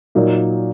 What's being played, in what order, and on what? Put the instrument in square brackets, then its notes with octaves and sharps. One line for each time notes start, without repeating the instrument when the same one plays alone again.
[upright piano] A#2 F#3 A#3 D#4